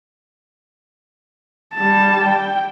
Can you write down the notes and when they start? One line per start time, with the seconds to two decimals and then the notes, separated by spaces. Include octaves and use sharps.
1.75 G3 A5
2.24 G5